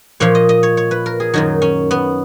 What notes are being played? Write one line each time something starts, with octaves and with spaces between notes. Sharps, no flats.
A#2 F3 C#5
D#5
D#5
C#5
C#5
B4
A#4
G#4
F#2 D#3 F#3 D#4
C#4
B3